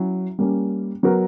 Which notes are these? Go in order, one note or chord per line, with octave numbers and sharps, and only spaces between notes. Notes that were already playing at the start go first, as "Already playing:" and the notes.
Already playing: F#3 C#4 E4
G3 A#3 C#4
F#3 B3 F#4 A#4